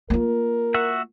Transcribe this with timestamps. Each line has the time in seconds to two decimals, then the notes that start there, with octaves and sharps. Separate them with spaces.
0.10 A#3 F4 A#4
0.74 F#4 E5 F#5